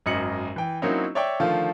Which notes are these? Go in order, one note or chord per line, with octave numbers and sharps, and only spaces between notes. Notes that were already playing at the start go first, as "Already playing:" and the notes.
G#1 F#2 D#5 C#7 F#7
E3 G5
F#3 A#3 C4 C#4 D#4 E4
C#5 D5 E5 G5 C#6
D3 D#3 F3 A3 F4